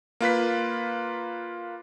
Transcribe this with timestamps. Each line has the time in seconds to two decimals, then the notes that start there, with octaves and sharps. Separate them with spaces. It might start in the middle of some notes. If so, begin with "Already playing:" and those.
0.21 A#3 F4 B4 B6